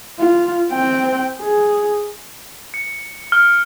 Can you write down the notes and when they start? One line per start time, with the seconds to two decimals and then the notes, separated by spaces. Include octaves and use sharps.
0.19 F4
0.72 C4 G5
1.41 G#4
2.74 C#7
3.32 F6